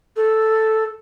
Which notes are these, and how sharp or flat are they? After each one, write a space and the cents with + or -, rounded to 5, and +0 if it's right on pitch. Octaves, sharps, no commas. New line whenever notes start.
A4 +0